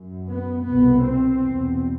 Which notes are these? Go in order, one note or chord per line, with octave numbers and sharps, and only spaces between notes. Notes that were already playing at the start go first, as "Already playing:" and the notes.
Already playing: F#2
B3
C2 B2 B3
C4
E2 B2